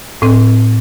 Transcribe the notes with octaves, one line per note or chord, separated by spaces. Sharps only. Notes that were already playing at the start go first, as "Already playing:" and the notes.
A2 C4